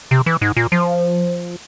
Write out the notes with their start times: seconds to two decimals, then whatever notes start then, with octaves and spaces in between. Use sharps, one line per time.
0.11 C3
0.26 E3
0.41 G#2
0.56 A#2
0.72 F3